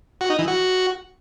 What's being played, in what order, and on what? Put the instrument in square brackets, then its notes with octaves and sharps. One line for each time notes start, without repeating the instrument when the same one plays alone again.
[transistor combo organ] F#4
D#4
E3
F#4